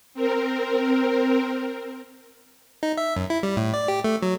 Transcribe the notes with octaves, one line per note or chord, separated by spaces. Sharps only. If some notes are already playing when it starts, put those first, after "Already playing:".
C4 A#4
D#4
E5
F#2
E4
G3
A2
D5
G4
A3
F#3